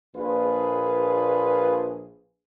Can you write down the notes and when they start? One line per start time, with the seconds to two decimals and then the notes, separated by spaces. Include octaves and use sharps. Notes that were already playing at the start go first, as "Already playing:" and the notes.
0.15 A#1 A#2 F4 G#4 B4